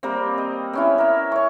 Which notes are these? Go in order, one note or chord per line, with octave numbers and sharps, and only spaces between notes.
G3 A#3 C4
D#5
B3 C#4 E4
A#4 E5
C#5 C#6